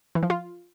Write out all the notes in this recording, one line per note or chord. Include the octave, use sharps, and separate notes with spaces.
E3
F3
F4